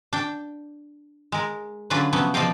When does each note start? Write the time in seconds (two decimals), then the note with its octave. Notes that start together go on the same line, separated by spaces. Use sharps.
0.13 D4 G5
1.32 G#3 A#4
1.90 D3 F#3 C#4 D4 F4 B4
2.13 C3 F3 F#3 B3 C#4
2.34 B2 F3 D5 D#5 F5 G5